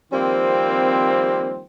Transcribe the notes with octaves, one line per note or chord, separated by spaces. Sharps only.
D#3 F3 G3 A#3 C4